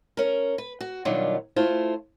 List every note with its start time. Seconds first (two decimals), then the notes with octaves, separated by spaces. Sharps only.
0.17 C#4 A#4
0.58 B4
0.81 F#4
1.05 B2 D#3 F#3 G3 D4 F4
1.56 A3 E4 F4 C5